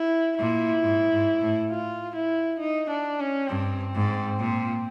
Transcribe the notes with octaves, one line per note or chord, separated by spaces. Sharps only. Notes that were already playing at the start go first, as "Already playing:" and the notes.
Already playing: E4
A#2 E4
G#2
G#2
A2
F4
E4
D#4
D4
C#4
G2 C4
G#2
A#2